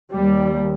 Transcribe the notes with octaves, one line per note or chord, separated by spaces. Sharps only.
D#2 G3